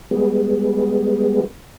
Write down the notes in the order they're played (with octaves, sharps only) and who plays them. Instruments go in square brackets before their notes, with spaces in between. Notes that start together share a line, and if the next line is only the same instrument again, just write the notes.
[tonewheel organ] G3 G#3 B3